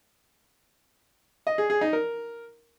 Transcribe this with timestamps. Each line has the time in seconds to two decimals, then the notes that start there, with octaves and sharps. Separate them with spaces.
1.47 D#5
1.58 G#4
1.70 G#4
1.81 D#4
1.93 A#4